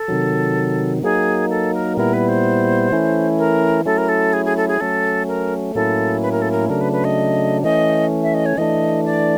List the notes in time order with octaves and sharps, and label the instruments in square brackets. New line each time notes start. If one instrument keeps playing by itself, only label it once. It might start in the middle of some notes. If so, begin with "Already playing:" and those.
Already playing: [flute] A4
[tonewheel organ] C3 D#3 F#3
[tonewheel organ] F#3 A#3 D#4 [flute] G#4
[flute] A4
A#4
[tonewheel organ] A#2 G3 B3 E4 [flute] A#4
[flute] B4
C5
[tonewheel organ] E3 A3 C#4 E4
[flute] A#4
[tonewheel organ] F#3 A3 C#4 E4 [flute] A4
[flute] A#4
A4
G#4
G#4
A4
G#4
[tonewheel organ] F#3 A3 C#4 [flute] A4
[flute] A#4
[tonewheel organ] A2 F#3 A#3 C#4 E4 [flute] A4
[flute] B4
A#4
A4
A#4
[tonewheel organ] C#3 F#3 A3 D4 [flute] A#4
[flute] B4
B4
D#5
[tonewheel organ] E3 A3 C#4 [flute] D#5
[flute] E5
D#5
C#5
[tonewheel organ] E3 A3 D4 [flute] D#5
[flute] D5